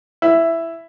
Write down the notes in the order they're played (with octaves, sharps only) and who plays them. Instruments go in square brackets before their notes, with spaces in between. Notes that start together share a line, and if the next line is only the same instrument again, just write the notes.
[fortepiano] E4